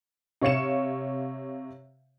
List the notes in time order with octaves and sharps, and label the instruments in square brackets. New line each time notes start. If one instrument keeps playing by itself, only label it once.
[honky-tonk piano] C3 C#5 F5 C#7 E7